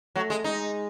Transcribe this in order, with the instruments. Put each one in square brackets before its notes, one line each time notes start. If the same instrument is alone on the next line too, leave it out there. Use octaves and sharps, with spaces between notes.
[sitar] F#3 [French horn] A3
[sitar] G#3
[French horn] G#3 [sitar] D#4